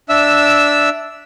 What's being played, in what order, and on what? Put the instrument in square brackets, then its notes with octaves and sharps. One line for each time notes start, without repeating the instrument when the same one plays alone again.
[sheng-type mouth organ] D4 E5 E6